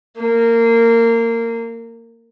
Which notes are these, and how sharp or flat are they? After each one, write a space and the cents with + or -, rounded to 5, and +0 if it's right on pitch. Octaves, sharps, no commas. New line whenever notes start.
A#3 -20